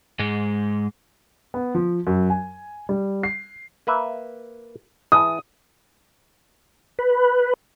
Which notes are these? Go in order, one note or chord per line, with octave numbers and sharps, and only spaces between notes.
G#2 G#3
B3
F3
F#2
G#5
G3
C7
A#3 B4 E5
E3 G#4 A5 D#6
B4